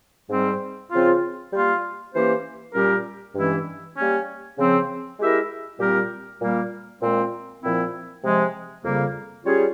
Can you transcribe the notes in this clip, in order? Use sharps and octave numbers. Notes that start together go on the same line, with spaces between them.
G#2 G3 C4
C#3 F3 C4 F4
G3 A#3 F4
E3 A#3 C#4 G4 C5
A#2 G3 C#4 G4 A#4
G2 E3 G#3 C#4 E4
G3 A#3 C#4
C#3 F3 C4
G#3 E4 G4 A#4 E5
A#2 G3 C4 G4 A#4
A#2 G3 A#3
A#2 G#3 C4
A#2 F3 C4 E4
C3 F3 G#3
F2 C#3 G3 A#3
G3 C#4 F4 G#4 C#5